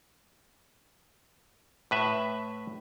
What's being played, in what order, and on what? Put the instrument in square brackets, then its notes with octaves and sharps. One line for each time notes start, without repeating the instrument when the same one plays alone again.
[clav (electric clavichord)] A2 B4 E5